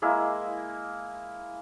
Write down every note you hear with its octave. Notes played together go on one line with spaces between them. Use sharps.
G#3 A#3 E4